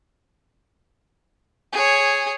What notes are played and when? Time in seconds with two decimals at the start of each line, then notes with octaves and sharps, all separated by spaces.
1.72 G#4 C#5